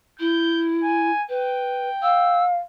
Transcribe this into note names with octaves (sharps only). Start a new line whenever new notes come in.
E4 G6
G#5
B4 G5
F5 E6